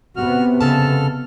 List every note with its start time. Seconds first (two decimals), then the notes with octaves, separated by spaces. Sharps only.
0.16 C3 B3 F#4 F6
0.61 F2 C#3 A4 A5 F6